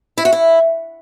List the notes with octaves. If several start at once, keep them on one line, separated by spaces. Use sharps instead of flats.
E4
F#4
E4